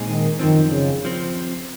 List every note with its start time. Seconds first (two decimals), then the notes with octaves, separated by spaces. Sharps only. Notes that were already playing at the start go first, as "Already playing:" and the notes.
Already playing: A#2 G#3 C4 D#4 G#4
0.08 D#3
0.39 F#2 D#3 F3 C4
0.71 C#3
1.05 F3 C4